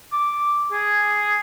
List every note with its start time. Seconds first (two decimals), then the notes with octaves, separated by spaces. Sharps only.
0.12 D6
0.72 G#4